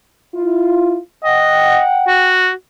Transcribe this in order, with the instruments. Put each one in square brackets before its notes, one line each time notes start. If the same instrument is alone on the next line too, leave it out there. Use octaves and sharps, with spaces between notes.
[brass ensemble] E4 F4
[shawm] D#5 [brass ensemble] F#5 G5
[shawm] F#4